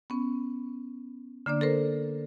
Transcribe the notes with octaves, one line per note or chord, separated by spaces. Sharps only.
B3 C#4
D3 A#3 D4 D5
A4 A#4 C5